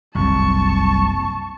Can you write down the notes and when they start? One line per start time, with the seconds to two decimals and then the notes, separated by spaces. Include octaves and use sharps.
0.15 F#1 C2 A5 C#6